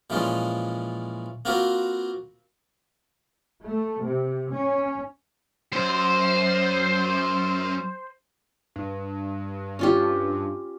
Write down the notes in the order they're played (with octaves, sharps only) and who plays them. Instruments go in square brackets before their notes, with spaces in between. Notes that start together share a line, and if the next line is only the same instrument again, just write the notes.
[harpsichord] A#2 E3 F3 G#3 C#4 F4
A#3 C4 F4 F#4 A#4 B4
[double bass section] A3
C3
C#4
[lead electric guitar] F#2 [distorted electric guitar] C5
[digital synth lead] G2
[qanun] C#4 F4 G4